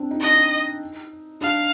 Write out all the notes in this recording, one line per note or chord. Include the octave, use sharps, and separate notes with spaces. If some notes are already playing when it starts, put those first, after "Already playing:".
Already playing: C4 D4
D#4
D4 D#5
D#4
D4 F5